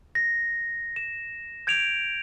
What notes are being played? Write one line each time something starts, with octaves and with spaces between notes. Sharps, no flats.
A#6
E7
G6 G#6 D7 F7